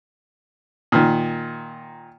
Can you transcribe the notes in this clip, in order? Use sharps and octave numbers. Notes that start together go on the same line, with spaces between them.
A#2 D#3